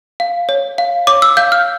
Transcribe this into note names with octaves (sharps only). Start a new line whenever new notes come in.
F5
C#5
F5
C#5 D6
E6
F5 G6
F6